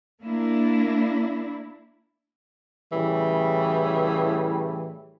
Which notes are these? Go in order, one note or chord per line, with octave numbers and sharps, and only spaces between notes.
A#3 D4 E4
A2 C#3 E3 G3